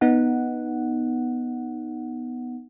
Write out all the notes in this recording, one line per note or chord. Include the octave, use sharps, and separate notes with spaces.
B3 D#4 F#5